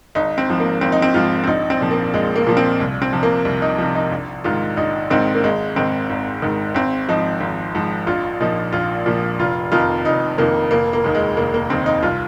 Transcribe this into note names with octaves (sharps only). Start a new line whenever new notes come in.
G#1 D#4
C4
G#2 F3
A#3
G#1 C4
D#4
C4
G#2 F3 F4
C4
A#1 D#4
C4
A#2 F3
A#3
A#1 G#3
A#3
A#2 F3
C4
C2
C4
C3 F3
A#3
C2
D#4
C3 F3
D#4
A#1
G#2 D#3 F4
A#1 D#4
G#2 D#3 C4
A#3
G#1 G#3
G#2 D#3 C4
G#1
G#2 D#3
G#1 C4
G#2 F3 D#4
G#1
G#2 F3
A#1 F4
A#2 F3 D#4
A#1 F4
A#2 F3
F1 F4
F2 C3 D#3 F4
F1 D#4
F2 C3 D#3 A#3
F1 A#3
A#3
D#2 D#3
G#3
F1 A#3
A#3
D#2 D#3 C4
D#4
C2 F4